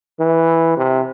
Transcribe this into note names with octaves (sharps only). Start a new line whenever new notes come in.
E3
C3